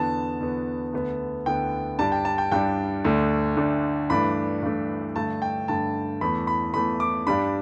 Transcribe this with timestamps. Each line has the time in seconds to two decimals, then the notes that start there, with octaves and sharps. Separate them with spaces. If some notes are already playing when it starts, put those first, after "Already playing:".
Already playing: E2 D3 B3 A5
0.40 E2 D3 B3
0.93 D2 D3 B3
1.46 D2 D3 B3 G5
1.98 G2 G3 D4 A5
2.12 G5
2.25 A5
2.38 G5
2.52 G2 G3 D4 G5
3.05 D2 D3 A3 D4
3.57 D2 D3 A3 D4
4.10 G2 E3 A3 D4 B5
4.63 G2 E3 A3 D4
5.16 G2 D3 A3 A5
5.42 G5
5.68 G2 D3 A3 A5
6.21 E2 E3 A3 B5
6.47 B5
6.74 E2 E3 A3 B5
7.00 D6
7.27 G2 G3 D4 B5